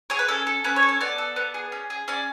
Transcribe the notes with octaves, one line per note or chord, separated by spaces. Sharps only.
G#4 C#5
B4
C#4 A4
A4
C#4 B4
C#5
A4
C#5
B3 D5
A4
B3
G#4
C#4
G#4
C#4 D5